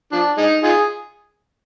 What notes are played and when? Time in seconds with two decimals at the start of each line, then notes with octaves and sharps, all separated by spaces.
0.12 F3 D4
0.37 G#3 D#4
0.63 D#4 F4 G#4